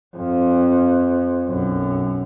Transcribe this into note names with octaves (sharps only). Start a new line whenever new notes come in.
F2
B1 F#2